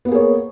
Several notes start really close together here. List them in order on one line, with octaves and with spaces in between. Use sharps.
B3 A#3 G#4 C#5